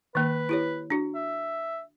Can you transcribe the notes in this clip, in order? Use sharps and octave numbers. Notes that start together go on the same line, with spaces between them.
D#3 A#3 B4
E4 G4 C#5
D4 F#4
E5